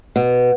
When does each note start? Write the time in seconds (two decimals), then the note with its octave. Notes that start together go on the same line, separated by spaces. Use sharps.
0.16 B2